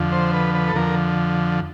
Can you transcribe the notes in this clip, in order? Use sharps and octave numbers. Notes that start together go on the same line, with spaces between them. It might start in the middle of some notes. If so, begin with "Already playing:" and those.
Already playing: F2 D3 F3
C5
B4
B4
A4
F2 D3 F3 A#4